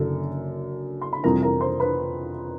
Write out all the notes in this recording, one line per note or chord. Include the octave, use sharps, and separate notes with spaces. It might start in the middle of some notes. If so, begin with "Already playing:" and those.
Already playing: F#1 F#2 D3 A4
C6
B5
F2 C3 E3 G3 A#4 A#5
A#4 A#5
C5 C6
B4 B5